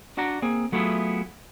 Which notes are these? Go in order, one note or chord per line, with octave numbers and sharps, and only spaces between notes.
D4 F#4 D5 F#5 A#5
A#3 C4 G#4
F#3 A3 B3 E4 F4 G#4